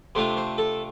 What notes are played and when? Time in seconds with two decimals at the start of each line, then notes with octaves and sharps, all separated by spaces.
0.15 C3 A3 D4 F4 C5
0.37 C5
0.58 A4